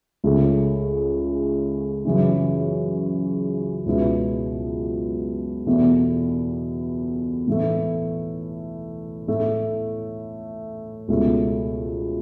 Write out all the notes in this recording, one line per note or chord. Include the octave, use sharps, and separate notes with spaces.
C#2 C#3 A3
F#2 C#3 E3 C#4 E4
C#2 B2 B3 E4
E2 B2 A3 E4
A2 E3 A3
A2 A3 E4
C#2 B2 A3